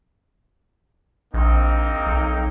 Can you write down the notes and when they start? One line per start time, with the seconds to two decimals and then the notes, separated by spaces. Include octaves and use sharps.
1.34 A#1 A#3 C4 D#4
2.06 B1